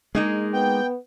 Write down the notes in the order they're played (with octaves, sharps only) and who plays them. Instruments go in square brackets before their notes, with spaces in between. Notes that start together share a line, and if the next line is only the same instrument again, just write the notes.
[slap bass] G#3 [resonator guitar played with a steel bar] A#3 D#4 G#4
[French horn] B3 [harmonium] G5